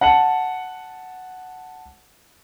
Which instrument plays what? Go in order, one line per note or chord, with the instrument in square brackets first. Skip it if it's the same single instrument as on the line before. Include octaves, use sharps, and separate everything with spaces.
[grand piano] F#5 A5 C#7 F#7